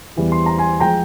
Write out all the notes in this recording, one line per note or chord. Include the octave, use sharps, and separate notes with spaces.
E2 E3 G3
C6
A#5
G#5 C6
F3 G#3 G5 A#5